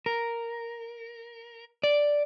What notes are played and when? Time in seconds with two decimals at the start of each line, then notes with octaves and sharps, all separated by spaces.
0.06 A#4
1.83 D5